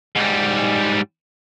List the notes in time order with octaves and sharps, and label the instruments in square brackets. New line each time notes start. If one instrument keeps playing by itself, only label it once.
[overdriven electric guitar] G#2 G3